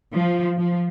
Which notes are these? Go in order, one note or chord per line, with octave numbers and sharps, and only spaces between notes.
F3
F3